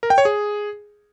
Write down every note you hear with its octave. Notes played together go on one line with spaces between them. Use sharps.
A#4
G5
C#5
G#4